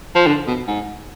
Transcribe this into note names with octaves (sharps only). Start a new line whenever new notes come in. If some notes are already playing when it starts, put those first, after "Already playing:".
F3
D3
B2
G#2